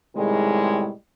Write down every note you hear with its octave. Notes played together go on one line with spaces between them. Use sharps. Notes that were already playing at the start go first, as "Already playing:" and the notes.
A2 C3 D#3 G3 G#3